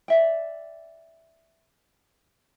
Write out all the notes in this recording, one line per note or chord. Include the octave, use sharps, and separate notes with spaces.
D5 E5 G5